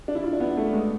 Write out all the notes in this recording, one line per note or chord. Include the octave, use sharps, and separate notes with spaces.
D4
E4
F4
D4
B3
A3
G#3